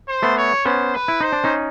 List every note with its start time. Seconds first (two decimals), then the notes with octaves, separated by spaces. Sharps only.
0.08 C5
0.22 A3 B3
0.37 C#5
0.65 B3 C#4 C5
0.94 B4
1.08 E4
1.20 D#4 C5
1.32 D4
1.44 C#4 D#4